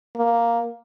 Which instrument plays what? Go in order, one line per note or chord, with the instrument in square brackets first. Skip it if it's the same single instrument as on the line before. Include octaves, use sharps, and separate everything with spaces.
[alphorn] A#3